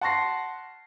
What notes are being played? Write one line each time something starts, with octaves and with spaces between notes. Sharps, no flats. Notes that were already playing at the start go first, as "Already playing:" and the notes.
F#5 A5 C6 C#6 A#6 C7